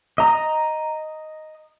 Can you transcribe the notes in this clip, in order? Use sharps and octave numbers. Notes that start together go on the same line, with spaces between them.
D#5 A#5